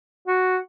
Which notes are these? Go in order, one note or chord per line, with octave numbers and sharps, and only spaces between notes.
F#4